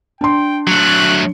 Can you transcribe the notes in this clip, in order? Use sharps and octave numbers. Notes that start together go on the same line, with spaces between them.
D4 G5 C6
F#3 A3 F#6